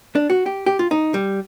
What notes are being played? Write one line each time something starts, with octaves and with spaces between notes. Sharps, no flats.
D4
F#4
G4
G4
F4
D#4
G3